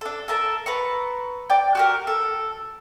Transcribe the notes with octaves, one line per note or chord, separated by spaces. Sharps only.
D4 A4
A4 A#4 A5
B4 A#5 C#6
D5 G5
F#4 G4 A#4
A4